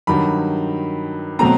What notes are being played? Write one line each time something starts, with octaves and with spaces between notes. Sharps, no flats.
G2 D#3 F#3 B5
B2 F#3 A3 C4 A#5